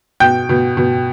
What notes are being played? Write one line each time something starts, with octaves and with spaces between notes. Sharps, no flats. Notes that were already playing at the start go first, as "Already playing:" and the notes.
B2 G5 G6
B2
B2